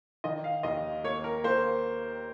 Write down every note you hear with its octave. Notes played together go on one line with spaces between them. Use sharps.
D#3 D#5
F5
D#2 D#5
A#3 C#5
A#4
A#3 C5